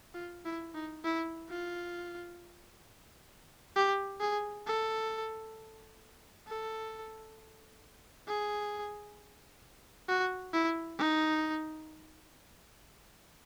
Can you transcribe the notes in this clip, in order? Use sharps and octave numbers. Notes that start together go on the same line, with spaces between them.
F4
E4
D#4
E4
F4
G4
G#4
A4
A4
G#4
F#4
E4
D#4